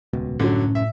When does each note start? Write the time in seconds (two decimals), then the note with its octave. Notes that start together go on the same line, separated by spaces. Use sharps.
0.13 D#1 C#2 B2
0.40 C2 F#2 A2 D3 F#3 C#4
0.75 E5